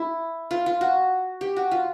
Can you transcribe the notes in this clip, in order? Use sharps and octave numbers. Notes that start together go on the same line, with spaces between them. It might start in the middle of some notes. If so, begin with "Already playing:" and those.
Already playing: E4
F4
F4
F#4
G4
F#4
F4